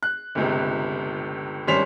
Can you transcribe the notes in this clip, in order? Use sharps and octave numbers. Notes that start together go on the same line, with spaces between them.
F#6
G1 C#2 C3
G#1 G2 C#4 C5 B6 F7